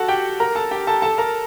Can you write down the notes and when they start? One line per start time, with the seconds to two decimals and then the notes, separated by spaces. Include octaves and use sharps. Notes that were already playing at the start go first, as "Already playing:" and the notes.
Already playing: F#4 A4 F#5 A5
0.09 G4 G5
0.40 A#4 A#5
0.55 A4 A5
0.71 G4 G5
0.87 A4 A5
1.02 A4 A5
1.18 A#4 A#5